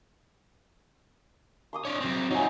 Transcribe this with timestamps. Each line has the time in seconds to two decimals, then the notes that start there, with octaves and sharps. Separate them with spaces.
1.73 C6 D6 D#6
1.85 D4 C#5
2.00 F#3 C4
2.31 F#3 D#4 F4 G#5